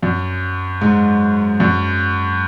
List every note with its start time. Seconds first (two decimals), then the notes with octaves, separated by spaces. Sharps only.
0.03 F#2
0.81 G#2
1.60 F#2